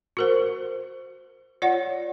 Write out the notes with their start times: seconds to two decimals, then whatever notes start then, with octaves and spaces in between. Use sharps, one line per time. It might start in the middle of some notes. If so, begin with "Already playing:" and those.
0.17 F#4 A#4 C5
1.62 F4 C#5 D5 F#5